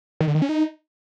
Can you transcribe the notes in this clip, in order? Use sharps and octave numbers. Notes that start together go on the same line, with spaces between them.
D#3
D3
D#3
C#4
D#4